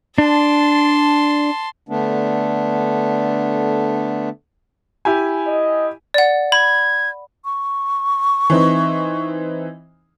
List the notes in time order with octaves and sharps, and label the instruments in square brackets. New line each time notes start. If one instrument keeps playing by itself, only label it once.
[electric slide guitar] D4 [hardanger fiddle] A5 C6
[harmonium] D3 A3 B3 D4
[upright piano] E4 G4 G#5
[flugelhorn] D#5
[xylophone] D5 F#5
[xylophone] B5 [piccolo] G#6
[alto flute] C#6
[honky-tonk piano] E3 C4 D#4